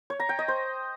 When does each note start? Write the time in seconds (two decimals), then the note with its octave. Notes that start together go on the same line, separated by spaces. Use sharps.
0.10 C#5
0.20 A#5
0.29 G5
0.39 D#5
0.48 C5